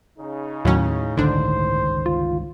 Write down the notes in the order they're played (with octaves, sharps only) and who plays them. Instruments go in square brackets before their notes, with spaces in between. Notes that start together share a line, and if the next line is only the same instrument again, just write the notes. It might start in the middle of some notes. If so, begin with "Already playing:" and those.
[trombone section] C#3 D#4
[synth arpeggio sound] D#2 F#3 C#4 [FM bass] A2
[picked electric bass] G1 C#2 D#3 [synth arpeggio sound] D3 D4 [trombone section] C5
[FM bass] F4